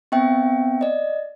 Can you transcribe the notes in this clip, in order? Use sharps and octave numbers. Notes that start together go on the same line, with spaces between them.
B3 C4 E5 G5
D5 D#5